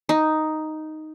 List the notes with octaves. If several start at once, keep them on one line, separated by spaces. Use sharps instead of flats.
D#4